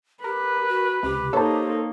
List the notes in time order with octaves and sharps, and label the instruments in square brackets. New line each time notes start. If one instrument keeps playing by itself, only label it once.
[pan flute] G4 [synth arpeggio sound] A#4 [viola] B4
[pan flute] F#4
[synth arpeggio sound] C#2 C3 [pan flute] G4
[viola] A#3 D#4 [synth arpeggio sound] A4 C5 [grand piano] C#5 A5